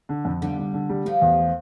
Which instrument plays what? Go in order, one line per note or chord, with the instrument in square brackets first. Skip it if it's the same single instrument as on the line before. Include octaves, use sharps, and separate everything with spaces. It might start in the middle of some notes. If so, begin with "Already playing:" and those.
[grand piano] D3
F2
[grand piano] D3 [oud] G3 B3
[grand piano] D3
D3
G3
[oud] F3 A3 [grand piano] G3
[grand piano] E2